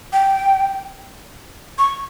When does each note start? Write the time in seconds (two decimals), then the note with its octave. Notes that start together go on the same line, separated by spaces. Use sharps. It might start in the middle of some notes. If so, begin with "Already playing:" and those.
0.13 G5
1.78 C#6